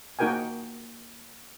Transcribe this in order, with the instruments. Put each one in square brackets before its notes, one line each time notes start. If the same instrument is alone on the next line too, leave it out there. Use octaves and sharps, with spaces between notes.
[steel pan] A#3 D#4 F#4 A#4 G5 G#5